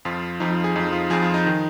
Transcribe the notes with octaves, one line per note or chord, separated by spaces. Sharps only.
F2 F3 F4
F2 F3 D#4
F4
G#4
F2 F3 D#4
F4
F2 F3 G#4
F4
D#4
D#3